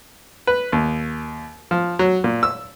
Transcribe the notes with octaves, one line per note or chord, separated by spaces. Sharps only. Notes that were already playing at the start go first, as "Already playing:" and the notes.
B4
D#2
F3
F#3
A#2
E6